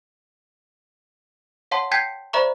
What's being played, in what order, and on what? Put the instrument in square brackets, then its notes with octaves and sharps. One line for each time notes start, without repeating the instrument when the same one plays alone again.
[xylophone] C#5 F5 F#5 A5 C6
G5 A5 G6 G#6 B6 C7
C5 D5 E5 A#5 B5 C#6